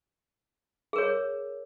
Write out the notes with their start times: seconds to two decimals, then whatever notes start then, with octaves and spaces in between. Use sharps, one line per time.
0.93 G#4
0.96 A#4
0.98 C#5